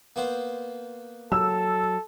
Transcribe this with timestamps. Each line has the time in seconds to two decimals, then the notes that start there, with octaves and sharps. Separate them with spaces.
0.16 A#3 B3 C5
1.32 F#3 A4 E6